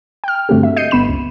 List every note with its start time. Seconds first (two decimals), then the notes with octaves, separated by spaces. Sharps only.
0.24 G5 F6
0.49 G2 D3 A3 C4 F#4 G4
0.63 E5
0.76 D#5 G6 C7 C#7 D#7
0.91 G1 B3 B5 E7
1.09 C#2